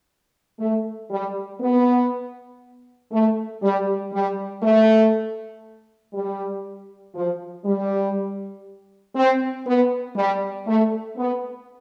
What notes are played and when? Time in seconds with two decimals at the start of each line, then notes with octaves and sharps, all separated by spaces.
0.60 A3
1.10 G3
1.61 B3
3.11 A3
3.62 G3
4.12 G3
4.63 A3
6.14 G3
7.14 F3
7.65 G3
9.16 C4
9.66 B3
10.16 G3
10.66 A3
11.17 B3